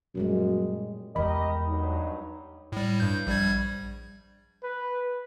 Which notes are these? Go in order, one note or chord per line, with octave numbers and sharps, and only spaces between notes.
F#2 A#2 G3 G#3
E2 G#3 G4 A#4 D#5 B5
G2 F#3 D#4
A2 G3
G2 G6
A#1 G3 G#6
B4